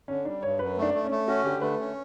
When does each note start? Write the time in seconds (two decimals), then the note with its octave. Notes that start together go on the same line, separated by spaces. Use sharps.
0.08 D3 C#4
0.25 G3 D4
0.43 G2 C#5
0.59 F#2 B4
0.77 A3
0.82 D4
0.94 A3
1.05 C#4
1.11 A3
1.28 C#4 F#4
1.44 D3 G4
1.61 A3 B4
1.79 C#4